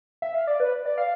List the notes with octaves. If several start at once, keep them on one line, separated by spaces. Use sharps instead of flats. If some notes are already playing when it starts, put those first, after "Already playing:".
E5
F5
D5
B4
D5
F5